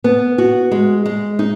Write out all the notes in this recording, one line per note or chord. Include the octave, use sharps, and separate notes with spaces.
B3
F#4
G#3
G#3
D#4